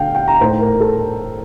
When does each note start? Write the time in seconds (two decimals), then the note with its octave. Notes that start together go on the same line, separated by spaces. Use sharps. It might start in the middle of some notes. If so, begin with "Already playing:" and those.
Already playing: D2 D3 A3 D4 F5 G5
0.15 G5
0.28 A#5
0.41 A2 A3 D#4 C5
0.60 A#4
0.80 A4